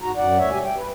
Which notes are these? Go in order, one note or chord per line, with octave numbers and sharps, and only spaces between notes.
G#2 F#4 A#5
F#2 D5 F#5
D2 C#5 E5
B2 G3 G4 E5 G#5
G5
B4